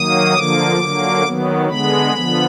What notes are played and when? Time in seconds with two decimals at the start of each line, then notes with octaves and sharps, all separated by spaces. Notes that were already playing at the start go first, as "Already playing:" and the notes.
Already playing: D#3 F#3 A#3 D#6
0.35 D3 F3 A#3 D6
0.79 D3 F#3 A#3
1.24 D#3 F#3 B3
1.68 D3 G#3 B3 B5
2.14 D3 F3 B3